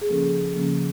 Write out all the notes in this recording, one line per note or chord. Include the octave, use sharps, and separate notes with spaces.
G#4
C#3 F3 A#3 C#4 A4
C#3 F3 A#3 C#4